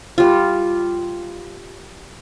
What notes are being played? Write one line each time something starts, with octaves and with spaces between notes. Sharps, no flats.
G3 F4